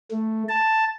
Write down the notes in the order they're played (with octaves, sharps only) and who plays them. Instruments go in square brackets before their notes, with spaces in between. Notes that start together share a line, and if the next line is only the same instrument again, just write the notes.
[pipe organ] A3
A5